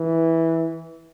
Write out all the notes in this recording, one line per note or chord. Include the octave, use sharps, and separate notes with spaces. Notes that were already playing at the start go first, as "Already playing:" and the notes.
Already playing: E3